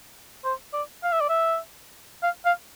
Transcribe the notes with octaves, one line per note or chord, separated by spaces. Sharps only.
C5
D5
F5
E5
D5
E5
F5
F5